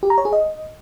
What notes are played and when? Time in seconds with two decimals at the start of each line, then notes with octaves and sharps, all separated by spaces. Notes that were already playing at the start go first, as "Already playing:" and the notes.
0.03 G4
0.10 A#5
0.18 C#5
0.25 G#4
0.33 D#5